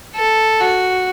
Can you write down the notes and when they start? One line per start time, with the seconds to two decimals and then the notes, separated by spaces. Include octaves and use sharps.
0.16 A4
0.60 F#4